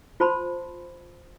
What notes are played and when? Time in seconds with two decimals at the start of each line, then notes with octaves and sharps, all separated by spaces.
0.20 F4 C5 A5 B5 C6